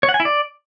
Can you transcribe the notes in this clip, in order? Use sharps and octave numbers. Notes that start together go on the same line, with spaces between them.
C#5
F#5
G#5
E4
D5